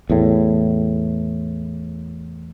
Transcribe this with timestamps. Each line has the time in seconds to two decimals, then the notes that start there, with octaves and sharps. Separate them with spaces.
0.10 E2 A2